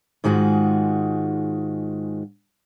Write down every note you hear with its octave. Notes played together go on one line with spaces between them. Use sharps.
G#2 D#3 G#3 F4 F#4